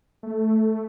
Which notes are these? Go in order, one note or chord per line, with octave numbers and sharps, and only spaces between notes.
A3